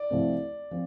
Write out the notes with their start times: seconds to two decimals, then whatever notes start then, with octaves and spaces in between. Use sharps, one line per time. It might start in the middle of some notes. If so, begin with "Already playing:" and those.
Already playing: D5
0.10 C2 C3 F3 A3 C4
0.71 F3 C4